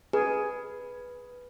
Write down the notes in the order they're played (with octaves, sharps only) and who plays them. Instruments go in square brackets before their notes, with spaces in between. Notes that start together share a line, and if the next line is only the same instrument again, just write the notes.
[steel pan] G#4 [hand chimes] B4